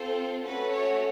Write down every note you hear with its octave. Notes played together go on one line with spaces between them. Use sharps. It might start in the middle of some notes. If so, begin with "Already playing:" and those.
Already playing: C4 F4 A4 C5
A3 C#4 F#4 A4 B4
C#5